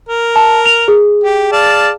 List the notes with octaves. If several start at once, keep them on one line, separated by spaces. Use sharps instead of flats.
A#4
A5
F7
G#4
G4
D5 F5 A5